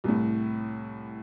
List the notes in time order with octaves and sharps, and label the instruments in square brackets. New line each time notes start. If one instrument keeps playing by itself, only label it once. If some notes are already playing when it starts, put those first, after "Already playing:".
[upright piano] C2 A2